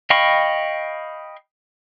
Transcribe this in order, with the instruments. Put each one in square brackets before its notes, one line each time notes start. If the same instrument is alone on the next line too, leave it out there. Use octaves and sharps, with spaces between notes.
[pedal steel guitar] D#5 F5 G5 B5 C#6